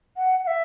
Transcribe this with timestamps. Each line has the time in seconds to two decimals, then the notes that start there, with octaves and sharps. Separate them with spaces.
0.16 F#5
0.43 F#5
0.47 E5